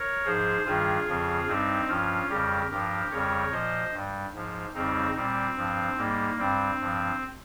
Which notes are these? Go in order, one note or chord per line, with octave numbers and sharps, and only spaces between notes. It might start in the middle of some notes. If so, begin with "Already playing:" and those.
Already playing: A#4 C#5
G#2 F3 G#4 C5
G2 D#3 G3 F4 G#4
F2 C#3 F3
G2 G3 C4 D#4
G2 F3 C#4 F4
F2 C#3 G3 G4 A#4
G2 F3 G4 A#4
F2 C#3 G3 A#4 C#5
A#2 F3 C5 D#5
G2 G3
G#2 F3
F2 C#3 G3 C4 D#4
A#2 G3 C4
G2 F3
G#2 G3 A#3
G2 G3 C4
G2 F3